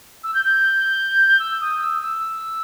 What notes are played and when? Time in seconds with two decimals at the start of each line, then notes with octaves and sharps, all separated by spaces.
0.23 E6
0.34 G6
0.45 G6
1.39 E6
1.61 D#6
1.81 E6
2.03 E6